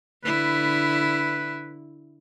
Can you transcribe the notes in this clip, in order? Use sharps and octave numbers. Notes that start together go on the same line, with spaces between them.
D3 E4 B4